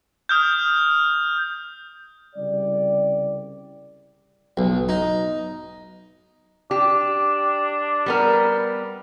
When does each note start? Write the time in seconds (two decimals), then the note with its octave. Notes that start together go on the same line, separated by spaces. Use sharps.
0.29 D#6 F6 G6
2.36 C2 C#3 G3 G4 D5
4.57 B1
4.89 D#4
6.71 D4 G4
8.06 G3 B3 A#4